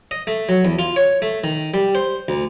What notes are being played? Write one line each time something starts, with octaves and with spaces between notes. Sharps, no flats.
D#5
A3
F#3
E2
F4
C#5
A3
D#3
G3
C5
D2